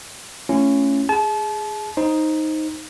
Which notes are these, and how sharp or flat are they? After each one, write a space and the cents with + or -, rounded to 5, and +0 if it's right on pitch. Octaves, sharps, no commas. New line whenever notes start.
A3 +0 C#4 +0 E4 +45
G#4 -5 A5 -35
D#4 +5 C5 +10